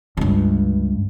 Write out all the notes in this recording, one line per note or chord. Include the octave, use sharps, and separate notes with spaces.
C#2 G2